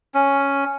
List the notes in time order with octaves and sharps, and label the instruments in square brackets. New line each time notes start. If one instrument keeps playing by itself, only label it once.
[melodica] C#4